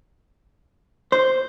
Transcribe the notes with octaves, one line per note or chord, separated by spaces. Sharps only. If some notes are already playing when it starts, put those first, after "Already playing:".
C5